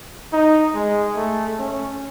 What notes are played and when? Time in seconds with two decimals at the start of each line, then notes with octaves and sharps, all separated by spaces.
0.33 D#4
0.75 G#3
1.17 A3
1.58 C#4